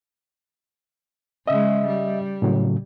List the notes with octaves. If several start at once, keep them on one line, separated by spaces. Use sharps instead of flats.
C#3 G#3 D#5 E5
G3
A2 C#3 F#3